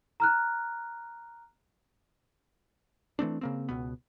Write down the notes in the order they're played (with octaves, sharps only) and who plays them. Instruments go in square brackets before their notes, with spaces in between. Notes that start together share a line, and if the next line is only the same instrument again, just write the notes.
[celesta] A#5 F6 F#6
[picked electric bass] E3 A3 C4 D4
C#3 A#3 C4
C#2 B2 B3